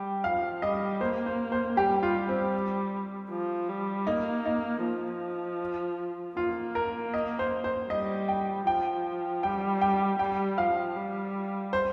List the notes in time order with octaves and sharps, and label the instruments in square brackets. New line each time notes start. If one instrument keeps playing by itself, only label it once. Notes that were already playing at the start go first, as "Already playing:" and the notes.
Already playing: [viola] G3 [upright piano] G5
[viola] F3 [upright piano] F5
[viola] G3 [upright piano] D#5
[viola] A#3 [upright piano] C5
[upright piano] C5
C5
[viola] G3 [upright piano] G4
[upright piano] F4
C4
[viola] F3
G3
[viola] A#3 [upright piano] D#4
[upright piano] D#4
[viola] F3
[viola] A#3 [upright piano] F4
[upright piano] A#4
D#5
C5
C5
[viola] G3 [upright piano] D#5
[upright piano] G5
[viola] F3 [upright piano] G5
[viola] G3 [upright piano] G5
[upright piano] G5
[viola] G3 [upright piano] G5
[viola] F3 [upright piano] F5
[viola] G3
[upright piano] C5